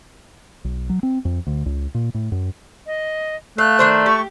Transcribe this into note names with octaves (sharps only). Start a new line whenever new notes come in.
B1
F#3
C4
F2
D2
C#2
A#2
A2
F#2
D#5
A3 F5 F#6
D#3 D4 C5
G4 C#6